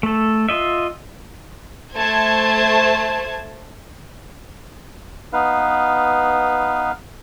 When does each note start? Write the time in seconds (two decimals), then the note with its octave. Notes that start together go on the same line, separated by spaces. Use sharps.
0.03 A3 A4
0.49 F4 D#5 E5
1.95 A3 C5 A5 G#6
5.33 B3 D#4 B4 F5